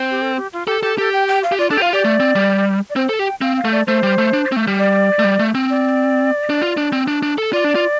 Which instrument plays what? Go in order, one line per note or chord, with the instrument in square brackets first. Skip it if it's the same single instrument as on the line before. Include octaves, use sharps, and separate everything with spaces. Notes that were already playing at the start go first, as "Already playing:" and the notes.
Already playing: [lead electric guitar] C4
[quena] G4
A4
G4
F4
[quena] G4 [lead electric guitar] A4
[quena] G4 [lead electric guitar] A4
[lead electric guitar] G4 [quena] A4
[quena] G5
G5
F5
[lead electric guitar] G4
[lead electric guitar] F4 [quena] D5
[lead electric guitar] D4 [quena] A4
[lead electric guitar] G4
[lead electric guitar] F4 [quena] F5
[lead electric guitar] G4 [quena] D5
[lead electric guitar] A3
C4
G3
[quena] D5
[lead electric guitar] C4 [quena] C5
[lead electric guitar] A4
[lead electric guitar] G4 [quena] G5
[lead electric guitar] C4 [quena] F5
[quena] F5
[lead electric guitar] A3
[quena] D5
[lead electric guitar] A3 [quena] C5
[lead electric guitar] G3
A3
D4
C4
A3
G3
[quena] D5
[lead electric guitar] A3
G3
A3
C4
[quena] D5
[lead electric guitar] D4
F4
D4
C4
D4
D4
A4
[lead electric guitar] F4 [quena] D5
[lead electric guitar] D4
F4